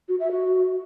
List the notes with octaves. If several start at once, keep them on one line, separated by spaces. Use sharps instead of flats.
F#4
E5
F#4